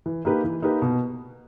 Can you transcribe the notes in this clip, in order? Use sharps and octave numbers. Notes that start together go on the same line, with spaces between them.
E3
A#3 D#4 G4 B4
E3
A#3 D#4 G4 B4
B2